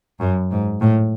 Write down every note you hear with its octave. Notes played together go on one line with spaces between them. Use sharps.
F#2
G#2
A2